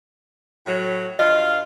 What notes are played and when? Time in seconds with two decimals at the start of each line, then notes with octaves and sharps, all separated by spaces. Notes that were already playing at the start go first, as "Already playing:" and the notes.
0.66 A2 F#3
1.19 G2 F4 D#5 F5